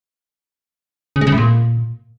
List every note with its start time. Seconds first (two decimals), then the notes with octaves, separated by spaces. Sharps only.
1.16 C#3
1.21 G#3
1.27 C#3
1.32 A2
1.38 A#2